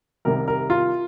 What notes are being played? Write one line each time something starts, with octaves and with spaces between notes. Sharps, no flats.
C2 C3 D#3 G3 A#4
A#4
F4